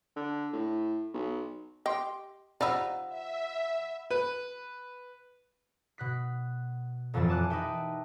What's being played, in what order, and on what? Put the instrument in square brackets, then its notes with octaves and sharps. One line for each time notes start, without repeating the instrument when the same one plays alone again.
[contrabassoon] D3
A2
B1
[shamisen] G4 [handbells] D#5 C6
[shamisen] F3 D#4 [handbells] D5 [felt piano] F#5 B5 E6
[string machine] E5
[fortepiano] B4
[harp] B2 F#6 B6
F1 F2 A#2 E3 F3 A6
G#5 A5 D6 F#6
D#4 G4 B4 E5 G5